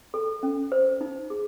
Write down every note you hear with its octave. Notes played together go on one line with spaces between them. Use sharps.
A4
C#4
C5
D#4
G#4